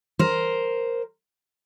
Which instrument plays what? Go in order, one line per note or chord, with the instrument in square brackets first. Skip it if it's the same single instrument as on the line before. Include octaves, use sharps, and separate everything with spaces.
[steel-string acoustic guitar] A#4 C5